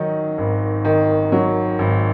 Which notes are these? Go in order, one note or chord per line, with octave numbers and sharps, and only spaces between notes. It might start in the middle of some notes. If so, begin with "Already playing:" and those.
Already playing: D#3 F#3 D#4
G#1
D#3
F#3
G#1